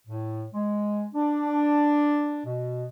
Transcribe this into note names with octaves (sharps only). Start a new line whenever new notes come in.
A2
G#3
D4
B2